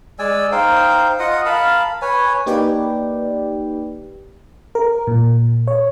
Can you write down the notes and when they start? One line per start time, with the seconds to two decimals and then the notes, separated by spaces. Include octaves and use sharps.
0.19 G#3 D5 G#5 E6
0.52 D#4 C5 F5 G5
1.19 F4 D#5 F#5 D#6
1.46 A#4 F5 A5 B5
2.02 B4 C#5 G#5
2.46 A#3 D#4 G4 B4 D5 G5
4.75 A#4
5.07 A#2
5.67 C#5